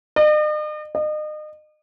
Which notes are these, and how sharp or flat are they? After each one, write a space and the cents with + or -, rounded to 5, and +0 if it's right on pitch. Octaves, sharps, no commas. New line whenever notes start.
D#5 -45
D#5 -35